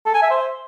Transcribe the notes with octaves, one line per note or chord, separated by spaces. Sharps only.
A4
G#5
E5
C5